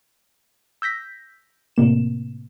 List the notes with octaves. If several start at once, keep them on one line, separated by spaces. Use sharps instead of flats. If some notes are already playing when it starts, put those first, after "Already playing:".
E6 G6 A#6 B6
A2 C3 A#3 E7